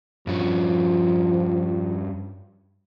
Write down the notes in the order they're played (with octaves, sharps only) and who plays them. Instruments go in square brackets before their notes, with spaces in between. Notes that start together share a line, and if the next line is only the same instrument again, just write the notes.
[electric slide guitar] G2 C#4 [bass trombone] F3